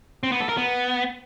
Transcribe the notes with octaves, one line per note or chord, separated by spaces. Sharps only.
C4
B3
A4
A#4
B3